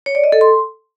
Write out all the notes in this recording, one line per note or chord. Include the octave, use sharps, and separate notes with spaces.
C#5
D5
D#5
A4
C6